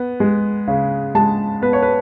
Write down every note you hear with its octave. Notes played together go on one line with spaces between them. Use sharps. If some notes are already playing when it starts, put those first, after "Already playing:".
Already playing: B3
G#3
C#3
G#3 A5
B3 B4
C#5
B4